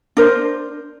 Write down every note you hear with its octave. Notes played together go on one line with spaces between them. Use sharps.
D4 A#4 C5